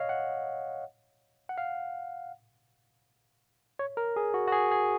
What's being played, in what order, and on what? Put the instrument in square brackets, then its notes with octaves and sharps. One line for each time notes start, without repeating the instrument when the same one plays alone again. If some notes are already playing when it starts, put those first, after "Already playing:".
Already playing: [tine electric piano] C#5 D#5 F5
F#5
F#5
F5
C#5
A#4
G#4
F#4
F#4
G#4
G#4